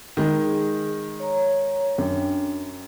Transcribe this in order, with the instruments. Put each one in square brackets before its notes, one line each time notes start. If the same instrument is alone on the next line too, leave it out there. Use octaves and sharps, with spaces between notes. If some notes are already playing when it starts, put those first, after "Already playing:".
[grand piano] D#3 G#3 [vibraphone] G#4
[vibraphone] C#5 A#5
[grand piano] F#2 [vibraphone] D4 G5